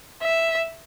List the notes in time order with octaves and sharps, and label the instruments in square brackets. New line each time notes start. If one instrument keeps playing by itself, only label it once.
[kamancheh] E5